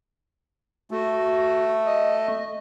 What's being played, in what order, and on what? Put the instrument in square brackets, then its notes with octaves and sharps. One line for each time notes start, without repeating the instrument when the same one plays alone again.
[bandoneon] A3 [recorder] F#4
[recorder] D#5